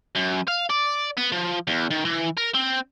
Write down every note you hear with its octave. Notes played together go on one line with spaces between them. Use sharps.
F#2
F5
D5
B3
F3
E2
D#3
E3
A#4
C4